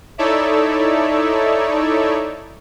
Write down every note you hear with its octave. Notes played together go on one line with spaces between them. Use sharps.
D#4 E4 A4 C#5 D5 E5